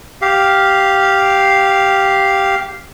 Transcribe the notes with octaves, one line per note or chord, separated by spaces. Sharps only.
G4 F5